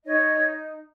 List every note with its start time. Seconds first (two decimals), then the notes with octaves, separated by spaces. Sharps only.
0.04 D#4 C#5 D#5
0.30 D#4